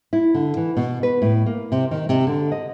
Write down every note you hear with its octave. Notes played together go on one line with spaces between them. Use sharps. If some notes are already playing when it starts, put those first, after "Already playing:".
E4
D3
E3
B2
B4
A2
A#3
C3
D#3
C3
D3
D#5